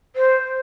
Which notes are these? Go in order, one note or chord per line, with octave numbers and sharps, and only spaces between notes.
C5